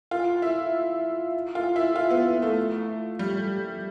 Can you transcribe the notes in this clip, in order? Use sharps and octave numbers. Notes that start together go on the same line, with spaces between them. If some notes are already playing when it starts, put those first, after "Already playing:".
F4
E4
F4
E4
F4
B3
A3
G3